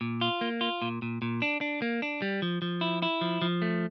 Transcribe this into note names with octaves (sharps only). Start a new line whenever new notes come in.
A#2
F4
A#3
F4
A#2
A#2
A#2
D4
D4
A#3
D4
G3
F3
F3
E4
E4
F3
F3
A3